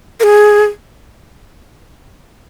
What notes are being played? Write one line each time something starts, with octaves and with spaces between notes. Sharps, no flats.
A#4
G#4